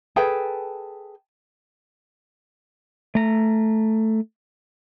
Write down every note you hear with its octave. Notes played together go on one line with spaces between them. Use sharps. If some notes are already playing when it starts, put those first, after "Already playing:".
G#4 A4 B4 G5
A3 A#5